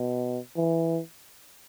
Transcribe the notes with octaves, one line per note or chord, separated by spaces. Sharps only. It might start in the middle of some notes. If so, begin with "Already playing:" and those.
Already playing: B2
E3